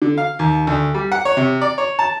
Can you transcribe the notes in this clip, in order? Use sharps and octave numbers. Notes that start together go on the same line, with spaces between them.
D3
F5
D#2
D2
G3
F#5
C#5
C3
D5
C#5
A5